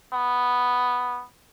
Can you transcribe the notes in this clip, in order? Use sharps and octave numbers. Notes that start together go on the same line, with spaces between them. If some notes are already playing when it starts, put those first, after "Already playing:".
B3